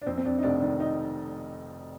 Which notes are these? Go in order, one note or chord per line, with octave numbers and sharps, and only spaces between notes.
D4
F2 C4
C4
F2 D4
D#4
F1 D4
D#3 D4
D#4